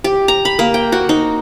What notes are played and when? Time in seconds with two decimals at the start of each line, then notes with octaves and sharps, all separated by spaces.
0.04 G4
0.28 A#5
0.45 B5
0.59 A#3
0.74 G5
0.92 F#4
1.09 D#4